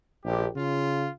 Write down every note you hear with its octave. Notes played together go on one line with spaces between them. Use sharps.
A#1 G4
C#3 F4